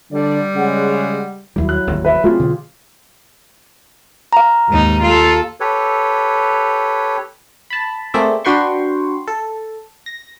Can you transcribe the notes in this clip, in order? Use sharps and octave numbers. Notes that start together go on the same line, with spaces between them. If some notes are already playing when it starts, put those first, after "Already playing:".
D3 G3 D5
C#3 G#3 F#5
D#2 F#3 G3 E4
F#6
G1 D#2 A2
B4 E5
A3 A#3 C4 F4 G4 G#4
B2 D3 E3
F5 A#5
D#2 G#2 D#4
F4 A4
G4 A4 B4 C#5
A5 B5
A3 A#3 C4 G#4 D5 E5
D4 F#4 B4 G5 C6 C#6
A4
A#6